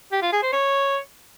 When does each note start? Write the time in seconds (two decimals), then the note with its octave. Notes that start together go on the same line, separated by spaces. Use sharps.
0.12 G4
0.22 F4
0.32 G#4
0.43 C5
0.53 C#5